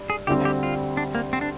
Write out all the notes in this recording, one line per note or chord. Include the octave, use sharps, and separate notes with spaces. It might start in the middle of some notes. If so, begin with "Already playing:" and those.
Already playing: G2
G#4
D2 D3 G3 C4 G4
G4
F4
D4
A#3
C4
D4